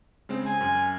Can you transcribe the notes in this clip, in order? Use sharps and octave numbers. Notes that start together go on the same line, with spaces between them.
C#3 G#3 C4
G#5
F#2